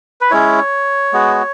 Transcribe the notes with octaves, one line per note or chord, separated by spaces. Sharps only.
B4
G#3 C#4 E4 C#5
G#3 B3 F#4